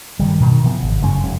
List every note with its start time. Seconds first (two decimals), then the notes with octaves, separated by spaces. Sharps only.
0.20 G2 D#3 G3
0.39 G2 B2 D#3
0.64 C3 E3 F3 B3
0.82 G#1
1.02 F#1 G#3 C#4
1.23 F1